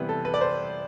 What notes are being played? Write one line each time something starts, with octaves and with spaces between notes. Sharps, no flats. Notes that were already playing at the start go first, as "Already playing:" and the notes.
Already playing: C3 E3 G3 B3 B4
A4
B4
D5
C5